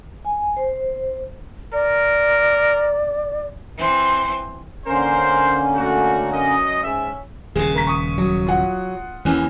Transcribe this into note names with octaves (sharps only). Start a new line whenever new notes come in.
G#5
C5
A#4 D5
E3 C4 C6
D3 A#3 C#4 A#4 C5
A3 F#4
F#2 D#5
G#2 C#4 E5
D#1 C#3 G#4
A#3 A#5 B6
C#6 D#6
F#3
F4 F#5
D#2 E3 A#3 C#4